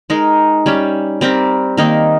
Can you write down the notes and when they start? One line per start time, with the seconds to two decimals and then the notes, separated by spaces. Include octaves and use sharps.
0.10 G#3 D#4 A#4
0.66 G3 C#4 G4
1.21 G3 C4 G4 A#4
1.77 D#3 A#3 D#4 A#4